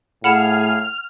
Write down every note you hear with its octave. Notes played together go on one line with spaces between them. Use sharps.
A2 G#4 F5 F#5 B5 F6 G#6 E7